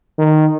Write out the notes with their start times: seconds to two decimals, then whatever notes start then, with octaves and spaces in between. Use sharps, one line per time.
0.18 D#3